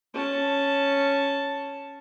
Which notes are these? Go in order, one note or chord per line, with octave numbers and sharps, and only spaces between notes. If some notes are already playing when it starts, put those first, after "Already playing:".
C#4 A5